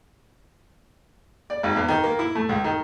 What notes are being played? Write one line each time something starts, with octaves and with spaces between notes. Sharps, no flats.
D5
G#1
E2
D#3
A#3
E4
A3
C#2
D#3